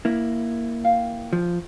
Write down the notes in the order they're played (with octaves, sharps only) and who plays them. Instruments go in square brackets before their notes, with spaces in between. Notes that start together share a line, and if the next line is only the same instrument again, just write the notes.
[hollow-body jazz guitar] A#3 E4
[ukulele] F5 G5
[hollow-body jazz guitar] F3